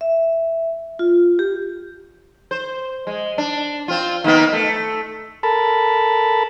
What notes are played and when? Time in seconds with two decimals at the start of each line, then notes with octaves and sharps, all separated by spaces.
0.01 E5
0.99 F4
1.39 G4
2.51 C5
3.07 G#3
3.38 D4
3.88 C4 F4
4.24 D#3 A#3 B3
4.53 A3
5.43 A4 A#4 A5 B5